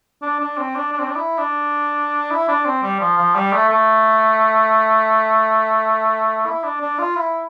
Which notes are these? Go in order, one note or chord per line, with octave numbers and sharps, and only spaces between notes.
D4
D4
C4
D4
D4
C4
D4
E4
D4
E4
D4
C4
G3
F3
F3
G3
A3
A3
E4
D4
D4
F4
E4